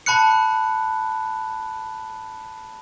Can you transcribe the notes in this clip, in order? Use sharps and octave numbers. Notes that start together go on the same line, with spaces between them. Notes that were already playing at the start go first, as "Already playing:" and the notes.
A5 B5 F#6 C#7